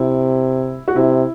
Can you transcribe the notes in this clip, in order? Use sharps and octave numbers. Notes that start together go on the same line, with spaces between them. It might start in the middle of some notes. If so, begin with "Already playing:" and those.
Already playing: C3 E4
F#4
C3 E4